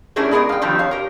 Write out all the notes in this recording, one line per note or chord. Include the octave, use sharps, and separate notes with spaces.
A3 C#4 D4 E4 G#4 A#4
G#3 B3 G#4 A#4 D5
F5 G5
D3 D#3 F3 G3 C4
C#5 F5
G4 A#4